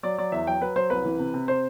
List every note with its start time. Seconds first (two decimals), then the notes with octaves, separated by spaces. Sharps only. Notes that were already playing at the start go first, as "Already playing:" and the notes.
0.03 F#3 D5
0.18 F#3 D5
0.32 E2 E5
0.47 F#3 G5
0.61 F#3 B4
0.76 F#3 C5
0.90 C2 B4
1.05 E3
1.19 C3
1.34 C3
1.48 C5